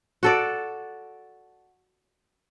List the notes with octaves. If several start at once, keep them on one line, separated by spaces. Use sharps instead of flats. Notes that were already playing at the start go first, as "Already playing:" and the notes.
F#4 A4 D5